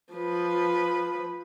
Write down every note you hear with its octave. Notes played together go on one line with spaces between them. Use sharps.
F3 B4